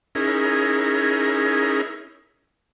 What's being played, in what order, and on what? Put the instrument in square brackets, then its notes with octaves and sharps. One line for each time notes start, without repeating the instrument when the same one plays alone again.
[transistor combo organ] C#4 D#4 E4 G#4 A#4